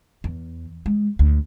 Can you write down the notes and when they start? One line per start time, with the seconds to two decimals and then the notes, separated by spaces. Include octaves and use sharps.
0.24 E2
0.86 G#3
1.19 D2